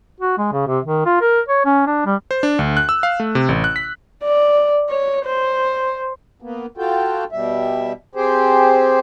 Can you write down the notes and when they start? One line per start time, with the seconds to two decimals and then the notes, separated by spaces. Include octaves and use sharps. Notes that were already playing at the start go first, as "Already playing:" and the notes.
0.20 F#4
0.38 G#3
0.52 C#3
0.67 C3
0.86 D#3
1.06 F4
1.21 A#4
1.49 C#5
1.65 C#4
1.87 D4
2.06 G3
2.31 C5
2.43 D4
2.59 D2
2.77 F#6
2.89 E6
3.03 F5
3.20 A3
3.35 C3
3.49 A1
3.64 F#6
3.76 B6
4.23 D5
4.90 C#5
5.25 C5
6.42 A#3 B3
6.78 F4 F#4 A4 G5
7.32 B2 G3 E5
8.15 C4 G4 G#4 C5